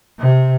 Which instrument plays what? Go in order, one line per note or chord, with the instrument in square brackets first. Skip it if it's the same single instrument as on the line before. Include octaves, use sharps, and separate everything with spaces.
[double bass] C3